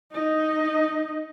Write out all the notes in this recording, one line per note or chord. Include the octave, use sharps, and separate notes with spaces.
D#4 D#5